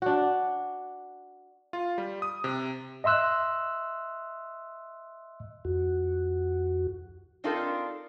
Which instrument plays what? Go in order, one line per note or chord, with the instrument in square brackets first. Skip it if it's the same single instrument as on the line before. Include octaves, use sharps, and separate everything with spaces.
[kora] D4 F#4
[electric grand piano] F4
G3
D#6
C3
[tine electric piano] D#5 E5 C6 E6 F#6
[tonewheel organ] F2 F#4
[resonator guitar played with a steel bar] C4 D4 D#4 F4 A4 A#4